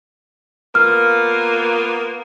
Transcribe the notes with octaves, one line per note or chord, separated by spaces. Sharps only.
A#3 B3 F4 F6